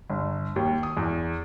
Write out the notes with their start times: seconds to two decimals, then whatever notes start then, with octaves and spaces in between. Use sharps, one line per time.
0.10 G1
0.56 D#2
0.83 D#6
0.97 E2